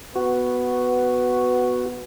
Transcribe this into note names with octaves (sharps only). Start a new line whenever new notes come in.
B3 F#4